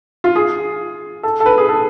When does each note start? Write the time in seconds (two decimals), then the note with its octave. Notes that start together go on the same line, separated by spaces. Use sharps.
0.24 F4
0.36 G#4
1.23 A4
1.40 A4
1.46 B4
1.58 G#4
1.69 A4